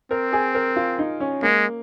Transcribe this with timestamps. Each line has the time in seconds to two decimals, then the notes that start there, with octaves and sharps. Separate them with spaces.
0.11 C4 A#4
0.33 G#4
0.55 A#4
0.76 F4
0.99 D#4
1.20 C#4
1.42 G#3 A#3